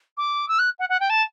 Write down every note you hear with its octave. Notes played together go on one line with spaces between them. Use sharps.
D6
E6
F#6
F#5
F#5
G5
A5